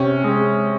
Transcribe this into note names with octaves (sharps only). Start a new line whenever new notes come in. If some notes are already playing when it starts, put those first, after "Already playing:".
Already playing: C3 C#4
G#3